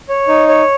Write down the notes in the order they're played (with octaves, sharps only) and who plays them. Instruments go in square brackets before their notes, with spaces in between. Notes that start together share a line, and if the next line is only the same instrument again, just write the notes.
[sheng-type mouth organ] C#5
D#4
C#5